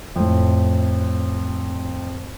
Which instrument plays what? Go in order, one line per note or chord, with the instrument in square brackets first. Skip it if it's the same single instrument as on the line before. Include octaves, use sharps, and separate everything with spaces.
[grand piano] F2 A2